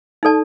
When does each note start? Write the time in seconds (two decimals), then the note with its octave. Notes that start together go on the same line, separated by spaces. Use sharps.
0.23 D#4 A4 D5 A5